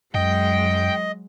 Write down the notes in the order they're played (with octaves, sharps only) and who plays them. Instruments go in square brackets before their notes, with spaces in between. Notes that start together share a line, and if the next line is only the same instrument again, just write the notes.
[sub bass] F#2 [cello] F#3 G#3 [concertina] D#5 [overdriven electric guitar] G5